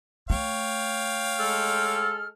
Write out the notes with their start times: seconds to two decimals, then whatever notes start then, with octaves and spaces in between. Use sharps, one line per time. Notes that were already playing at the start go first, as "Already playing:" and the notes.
0.30 A3 C#5 F5 G5
1.38 G#3 A4 F6